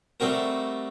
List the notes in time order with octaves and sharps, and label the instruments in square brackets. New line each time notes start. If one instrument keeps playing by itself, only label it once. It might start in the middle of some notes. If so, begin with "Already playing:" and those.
[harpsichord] G3 A3 C4 F#4 A#4